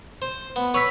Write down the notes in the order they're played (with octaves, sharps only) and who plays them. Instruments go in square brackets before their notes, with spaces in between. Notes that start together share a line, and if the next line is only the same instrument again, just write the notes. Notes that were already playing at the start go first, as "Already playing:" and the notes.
[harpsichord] C5
B3
[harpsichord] B4 C#5 [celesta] C#6 E6 B6